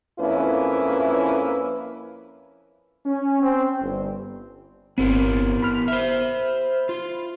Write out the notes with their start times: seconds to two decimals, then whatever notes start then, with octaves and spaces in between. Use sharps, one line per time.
0.19 F2 A#3 C#4 E4 B4
3.05 C#4
3.41 C4
3.80 G1
4.98 G1 B3 C4 E4 A#4
5.62 B5 F6
5.88 C5 E5
6.89 F4